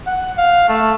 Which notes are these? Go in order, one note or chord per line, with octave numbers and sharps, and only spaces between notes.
F#5
F5
A3